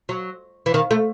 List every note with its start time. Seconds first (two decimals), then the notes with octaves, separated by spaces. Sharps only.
0.09 F#3
0.66 E3
0.74 D#3
0.91 A3